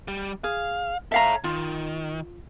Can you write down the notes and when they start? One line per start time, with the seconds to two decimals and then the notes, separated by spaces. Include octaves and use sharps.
0.08 G3
0.44 G#4 F5
1.12 A4 C#5 E5 F5 A#5
1.44 D#3 F4